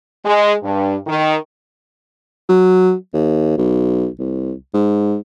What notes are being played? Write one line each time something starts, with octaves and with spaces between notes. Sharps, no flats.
G#3
G2
D#3
F#3
D#2
B1
C2
G#2